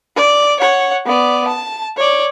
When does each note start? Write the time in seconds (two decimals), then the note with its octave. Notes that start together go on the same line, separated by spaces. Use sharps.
0.16 D5
0.60 C#5 F#5
1.06 B3 D5
1.47 A5
1.97 C#5 D5